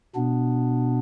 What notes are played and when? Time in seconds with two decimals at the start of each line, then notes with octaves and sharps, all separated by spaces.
0.15 B2 B3 D4